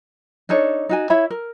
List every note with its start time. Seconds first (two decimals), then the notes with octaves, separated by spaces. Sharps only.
0.49 D4 D#4 A4 C#5
0.89 D#4 F#4 G#5
1.10 E4 C#5 E5 B5
1.30 A#4